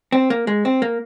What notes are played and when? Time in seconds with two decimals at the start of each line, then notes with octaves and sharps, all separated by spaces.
0.12 C4
0.30 A#3
0.47 G#3
0.65 C4
0.82 A#3